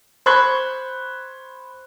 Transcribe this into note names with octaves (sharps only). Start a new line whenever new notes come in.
C5 B5 C#6 F#6 G#6